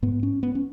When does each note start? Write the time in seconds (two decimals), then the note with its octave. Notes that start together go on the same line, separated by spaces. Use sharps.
0.02 G#2 B3
0.23 C#4
0.43 B3
0.55 C#4